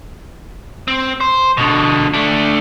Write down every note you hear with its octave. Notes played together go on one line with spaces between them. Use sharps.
C4
C5
B2 D3
A3 D4